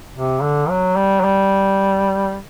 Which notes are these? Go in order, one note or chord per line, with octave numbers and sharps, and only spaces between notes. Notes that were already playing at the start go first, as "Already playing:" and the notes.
C3
D3
F#3
G3
F#3
G3